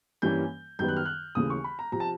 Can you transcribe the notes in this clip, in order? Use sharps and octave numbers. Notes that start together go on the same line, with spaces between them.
G2 E3 G3 A#3 C#4 G6
F#2 D#3 G3 B3 G6
F#6
F6
F#6
D#2 C#3 E3 A3 D#6
C#6
B5
A#5
C3 F3 A#5
A5